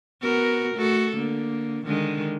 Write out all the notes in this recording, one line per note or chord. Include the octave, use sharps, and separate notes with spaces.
B3 F#4 A#4
A3 F#4 A4
D3 A#3
D3 D#3 G#3